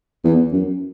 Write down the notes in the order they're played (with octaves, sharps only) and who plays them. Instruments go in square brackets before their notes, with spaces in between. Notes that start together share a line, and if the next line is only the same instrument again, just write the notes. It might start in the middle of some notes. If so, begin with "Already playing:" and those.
[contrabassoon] E2
F#2